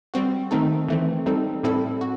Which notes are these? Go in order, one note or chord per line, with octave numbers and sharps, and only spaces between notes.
G3 C4 F#4
D#3 A3 C4 D#4 A4
E3 A3 C4
G3 C4 D#4 A4
A2 G3 C4 E4 A4
F#4